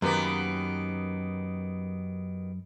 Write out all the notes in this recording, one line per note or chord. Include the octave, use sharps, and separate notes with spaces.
F#2 D#3 A#3 B3 G4